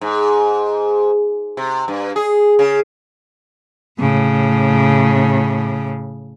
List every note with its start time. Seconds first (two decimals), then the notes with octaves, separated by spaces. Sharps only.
0.01 G#2
1.57 C3
1.88 G2
2.16 G#4
2.59 C#3
3.99 A2 C#3